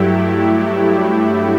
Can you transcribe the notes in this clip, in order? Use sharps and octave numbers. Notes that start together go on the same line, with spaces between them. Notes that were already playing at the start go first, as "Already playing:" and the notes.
Already playing: G2 F#3 A3 E4 G4